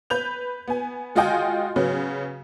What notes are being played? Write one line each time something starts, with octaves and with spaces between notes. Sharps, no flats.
B4 G6 F7
B3 G#5
G#3 F4 F#4 D#5 G5 G#5
C#3 F#3 B3